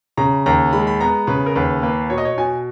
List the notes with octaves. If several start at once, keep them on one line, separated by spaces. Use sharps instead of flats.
C#3 A#5
D#2 A#5
G#3 B5
B5
B3 A#5
C#3 B4
A#4
D#2 B4
A#3 B4
B2 C#5
D#5
C#5
B2 G#5